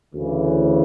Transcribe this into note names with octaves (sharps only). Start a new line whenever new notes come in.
D2 C#3 E3